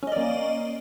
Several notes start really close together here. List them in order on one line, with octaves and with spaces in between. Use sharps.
C#4 D#5 D5 A#3